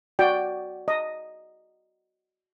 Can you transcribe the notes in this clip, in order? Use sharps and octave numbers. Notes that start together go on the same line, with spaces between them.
F#4 D5 G5
D#5